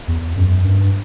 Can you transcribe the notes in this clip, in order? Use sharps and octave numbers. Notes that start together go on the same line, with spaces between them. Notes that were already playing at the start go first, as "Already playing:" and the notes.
E2
F#2
G2